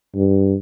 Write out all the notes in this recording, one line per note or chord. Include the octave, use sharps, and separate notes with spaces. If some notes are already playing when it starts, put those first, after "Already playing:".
G2